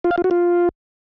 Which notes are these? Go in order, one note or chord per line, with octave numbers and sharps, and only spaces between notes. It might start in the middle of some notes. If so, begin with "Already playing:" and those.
F4
F5
F4
F#4
F4